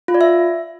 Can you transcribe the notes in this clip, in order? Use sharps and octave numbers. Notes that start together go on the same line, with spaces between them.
F4
D5
E5